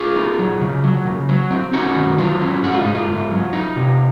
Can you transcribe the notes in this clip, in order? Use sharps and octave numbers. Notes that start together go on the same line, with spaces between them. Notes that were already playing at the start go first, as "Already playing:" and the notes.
Already playing: F4 G#4
D#4
F#3
C#3
F#3
C#3
F#3
C4
C#4 D#4 F#4
D#3
F#3 F4
C#4
G#2 F#4
F4
G#2 D#4
F4
G#2
F#3
D#4
C3